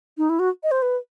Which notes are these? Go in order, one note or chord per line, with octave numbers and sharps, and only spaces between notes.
D#4
E4
F#4
D#5
C5
B4